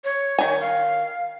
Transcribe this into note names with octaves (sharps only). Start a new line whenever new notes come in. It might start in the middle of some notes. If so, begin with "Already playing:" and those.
C#5
D#3 G#5
F5